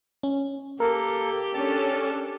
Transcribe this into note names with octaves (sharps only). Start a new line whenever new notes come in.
C#4
A#3 G4 A4 A#4
C#4 D4 A4 A5